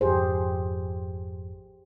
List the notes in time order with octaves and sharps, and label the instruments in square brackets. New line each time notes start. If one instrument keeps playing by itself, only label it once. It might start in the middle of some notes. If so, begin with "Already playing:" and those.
[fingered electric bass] G#1 F2 [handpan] G4 G#4 C5